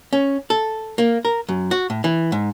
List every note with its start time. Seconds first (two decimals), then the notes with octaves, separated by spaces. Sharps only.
0.13 C#4
0.50 A4
0.98 A#3
1.25 A#4
1.49 F#2
1.71 F#4
1.90 A2
2.04 E3
2.32 G#2